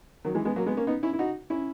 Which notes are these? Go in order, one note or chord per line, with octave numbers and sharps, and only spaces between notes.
D#3 F#3
E3 G#3
G#3 B3
F#3 A#3
G#3 B3
A#3 C#4
B3 D#4
C#4 E4
E4
D#4 F#4
C#4 E4